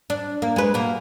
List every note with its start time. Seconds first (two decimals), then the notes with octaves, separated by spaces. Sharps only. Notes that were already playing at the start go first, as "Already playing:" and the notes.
0.10 D4
0.42 A#3
0.56 G#3 B4
0.74 B2 A#3